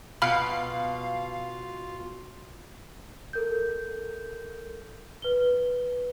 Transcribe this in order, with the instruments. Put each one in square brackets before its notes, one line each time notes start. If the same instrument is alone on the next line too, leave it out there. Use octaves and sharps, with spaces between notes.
[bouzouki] B2 [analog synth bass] F4 [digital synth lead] F5 [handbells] B5 F6
[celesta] A4 A#4 G6
B4 G7